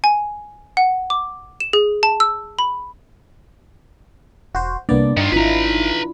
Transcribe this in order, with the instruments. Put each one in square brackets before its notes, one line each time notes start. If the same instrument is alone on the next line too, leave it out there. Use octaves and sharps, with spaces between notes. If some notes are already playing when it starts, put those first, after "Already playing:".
[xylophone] G#5
F#5
D6
E7
G#4
A5
E6
B5
[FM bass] E1 [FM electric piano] F#4 C5
[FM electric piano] C2 B3 D5 [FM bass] A#3 [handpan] D4
[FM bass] G2 [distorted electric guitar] D#3 F4 [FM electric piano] D#4
[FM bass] G#1 [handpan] E4 F4 [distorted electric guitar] B4 A#5